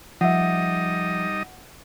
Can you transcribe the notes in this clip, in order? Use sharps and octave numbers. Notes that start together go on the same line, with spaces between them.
F3 G3 D#4 D#5 E5 F#5